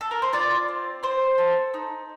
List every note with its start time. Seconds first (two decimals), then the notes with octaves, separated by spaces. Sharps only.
0.01 A4
0.11 A#4
0.22 C5
0.33 F4 D5
0.68 C4
1.03 C4 C5
1.38 A4
1.74 D#4